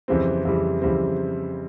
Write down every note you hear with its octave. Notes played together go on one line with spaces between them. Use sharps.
F2 C#3 E3 G3 C4
F2 C#3 E3 G3 C4
F2 C#3 E3 G3 C4